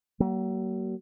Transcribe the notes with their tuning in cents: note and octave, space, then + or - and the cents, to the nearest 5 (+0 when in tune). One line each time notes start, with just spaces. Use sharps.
F#3 +40 A#3 +0